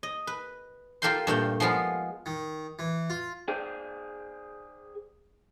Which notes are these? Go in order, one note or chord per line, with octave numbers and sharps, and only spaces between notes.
D#5
B4
F4 G4 A4 A#4 G5 C6
G2 A#2 A3 G5
F3 G#3 B3 F4
D#3
E3
F4
G#4 C5 D5 G5